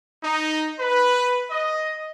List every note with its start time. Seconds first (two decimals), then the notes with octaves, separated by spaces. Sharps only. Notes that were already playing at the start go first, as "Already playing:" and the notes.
0.24 D#4
0.79 B4
1.51 D#5